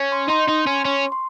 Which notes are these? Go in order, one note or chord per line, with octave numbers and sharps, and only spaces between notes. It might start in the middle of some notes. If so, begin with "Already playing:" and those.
Already playing: C#4
C6
D#4 C6
D#4
C#4
C6
C#4 C#6
C6